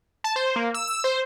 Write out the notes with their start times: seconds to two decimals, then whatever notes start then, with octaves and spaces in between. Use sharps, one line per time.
0.24 A5
0.36 C5
0.56 A#3
0.74 E6
0.87 E6
1.04 C5